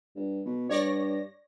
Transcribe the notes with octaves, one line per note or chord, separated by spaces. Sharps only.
G2
B2
G2 C#5 D5 A#6